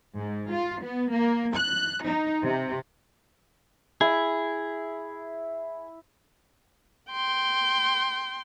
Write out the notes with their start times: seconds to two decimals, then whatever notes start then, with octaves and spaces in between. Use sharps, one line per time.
0.17 G#2
0.52 F4
0.83 B3
1.13 A#3
1.56 F#6
2.04 D#4
2.44 C3
4.01 E4 G#4
7.11 G5 C6